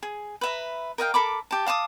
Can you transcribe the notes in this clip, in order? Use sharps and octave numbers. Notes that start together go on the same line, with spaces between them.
G#4
B4 E5 A#5
A#4 D#5 F5 G5
A4 A#4 B5 D6
G4 A5
F5 A5 D6 D#6